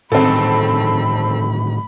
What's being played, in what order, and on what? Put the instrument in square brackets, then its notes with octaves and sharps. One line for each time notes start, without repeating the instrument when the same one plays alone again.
[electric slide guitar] A2 D3 D#3 [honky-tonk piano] C4 A4 [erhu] B5